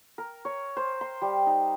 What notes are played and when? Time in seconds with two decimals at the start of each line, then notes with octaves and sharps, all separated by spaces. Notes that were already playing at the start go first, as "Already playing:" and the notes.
0.18 A#4
0.45 C#5
0.77 C5
1.01 C6
1.22 G3
1.47 D#4